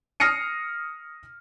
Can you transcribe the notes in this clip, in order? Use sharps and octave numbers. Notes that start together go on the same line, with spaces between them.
D#6 F6 A#6 C7 C#7 D#7